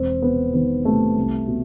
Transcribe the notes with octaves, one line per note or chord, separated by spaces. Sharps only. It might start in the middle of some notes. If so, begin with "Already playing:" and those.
Already playing: E1 C4
C3 B3
D#3 B3
C3 A3
C2
B2